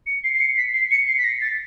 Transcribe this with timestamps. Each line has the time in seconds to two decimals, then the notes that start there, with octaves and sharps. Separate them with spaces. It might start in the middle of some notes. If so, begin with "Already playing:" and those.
0.07 C#7
0.24 C7
0.34 C7
0.40 C#7
0.57 B6
0.74 C7
0.91 C#7
1.08 C7
1.18 B6
1.24 A#6
1.41 A6